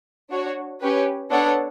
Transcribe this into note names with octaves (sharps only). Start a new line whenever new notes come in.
D4 F#4 C#5
C#4 G4 B4
B3 D4 A4 C#5 F#5